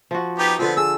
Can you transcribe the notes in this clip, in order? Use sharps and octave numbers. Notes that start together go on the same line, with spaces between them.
F3 F#4
B3 D#4 G4
D3 F3 B3 C4
G#4 E6